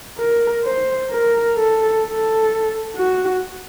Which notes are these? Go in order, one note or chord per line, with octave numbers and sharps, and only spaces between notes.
A#4
C5
A#4
A4
A4
F#4